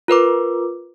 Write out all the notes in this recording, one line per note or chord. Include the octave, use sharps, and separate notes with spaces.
F4 A#4 B4 D6